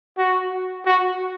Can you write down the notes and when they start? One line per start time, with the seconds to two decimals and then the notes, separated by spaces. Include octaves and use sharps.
0.18 F#4
0.85 F#4